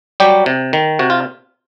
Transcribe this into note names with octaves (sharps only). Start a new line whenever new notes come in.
F#3 G3 G4
C3
D#3
C3 F#4
F4